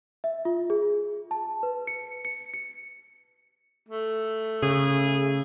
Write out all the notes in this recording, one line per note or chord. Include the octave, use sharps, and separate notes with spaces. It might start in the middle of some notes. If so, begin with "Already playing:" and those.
E5
F4
G#4
A5
B4
C#7
C#7
C#7
A3
C#3 G#4